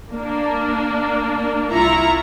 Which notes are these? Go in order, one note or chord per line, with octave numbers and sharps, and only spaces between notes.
A#3 D4
C2 E4 F4 A#5 C#6